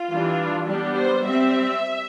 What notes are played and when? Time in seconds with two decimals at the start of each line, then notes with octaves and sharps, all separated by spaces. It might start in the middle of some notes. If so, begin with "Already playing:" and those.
Already playing: F4
0.10 E3 G3 D4
0.66 G3 B3 D4 G4
0.94 C5
1.23 G3 C4 E5